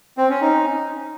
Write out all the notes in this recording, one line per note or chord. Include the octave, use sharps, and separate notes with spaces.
C4
C#4
D#4